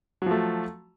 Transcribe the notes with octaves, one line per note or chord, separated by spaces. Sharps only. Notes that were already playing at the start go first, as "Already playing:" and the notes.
F3 F#3 A3